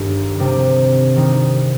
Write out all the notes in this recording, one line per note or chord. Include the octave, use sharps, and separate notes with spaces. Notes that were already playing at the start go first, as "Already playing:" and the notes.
Already playing: G1 G2 D#3
C3 D#3 G3 D4
D#3 G3 C4 D#4